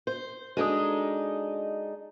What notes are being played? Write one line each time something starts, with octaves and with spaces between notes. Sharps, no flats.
C5
G#3 D4 D#4 F#4 A4 D#6